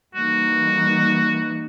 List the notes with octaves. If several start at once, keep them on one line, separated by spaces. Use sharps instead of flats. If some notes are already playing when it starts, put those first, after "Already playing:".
E3 G3 A#3 D#4 F#4